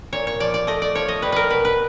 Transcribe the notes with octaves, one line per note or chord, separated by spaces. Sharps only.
A#2 C#5
C#5
F3 D5
D5
A3 D#5
D5
F3 C#5
D#5
G3 B4
A#4 B4
B2 B4
B4